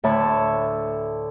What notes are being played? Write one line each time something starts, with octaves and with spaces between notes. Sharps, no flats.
D2 A2 C#5 E5 A5 B5